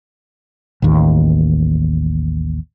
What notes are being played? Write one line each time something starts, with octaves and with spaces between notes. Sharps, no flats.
A1 D#2